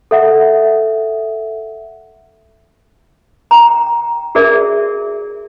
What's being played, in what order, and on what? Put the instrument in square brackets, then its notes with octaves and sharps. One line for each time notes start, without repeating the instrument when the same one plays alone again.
[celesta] A4 E5 F#5
[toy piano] G5 A#5
F#4 G#4 A#4 D5 E5